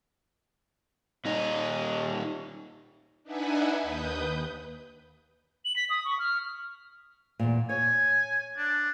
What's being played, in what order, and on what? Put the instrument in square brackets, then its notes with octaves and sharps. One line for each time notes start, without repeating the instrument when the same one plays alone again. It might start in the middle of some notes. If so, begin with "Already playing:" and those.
[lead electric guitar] A#2 D#4
[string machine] D4 D#4 B4 E5 F#5 G#5
D#2 B4 D#6 G6
[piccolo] F#7
B6
D#6
C#6
F6
[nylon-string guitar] E2 A#2
[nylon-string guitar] C#5 [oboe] G#5
[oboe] D4